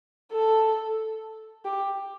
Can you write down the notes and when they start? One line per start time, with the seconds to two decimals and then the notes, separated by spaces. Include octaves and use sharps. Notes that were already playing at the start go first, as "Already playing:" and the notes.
0.33 A4
1.65 G4